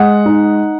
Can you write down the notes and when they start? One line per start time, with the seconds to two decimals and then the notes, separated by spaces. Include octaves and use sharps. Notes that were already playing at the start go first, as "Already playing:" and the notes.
Already playing: G#3 F#5
0.26 D#4